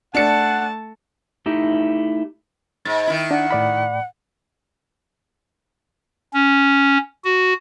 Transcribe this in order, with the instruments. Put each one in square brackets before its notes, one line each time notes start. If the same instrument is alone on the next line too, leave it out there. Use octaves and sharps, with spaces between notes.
[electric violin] A3 A5 [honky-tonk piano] D4 C#7 [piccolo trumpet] F#5
[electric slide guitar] A3 D#4 E4 G4
[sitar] G#2 [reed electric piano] A6
[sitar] D#3 E4
[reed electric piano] D4 [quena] F#5
[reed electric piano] A2 D5 B5
[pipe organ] C#4
F#4